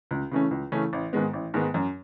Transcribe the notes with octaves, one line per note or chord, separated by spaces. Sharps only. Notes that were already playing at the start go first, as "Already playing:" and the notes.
C#2
C#3 E3 A3 C#4
C#2
C#3 E3 A3 C#4
A1
G#2 D#3 G#3 B3
A1
G#2 D#3 G#3 B3
F#2